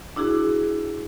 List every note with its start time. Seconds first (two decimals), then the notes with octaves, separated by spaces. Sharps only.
0.16 D4 E4 F#4 G#4